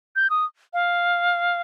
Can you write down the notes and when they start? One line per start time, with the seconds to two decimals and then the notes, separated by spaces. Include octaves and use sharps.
0.16 G6
0.30 D#6
0.73 F5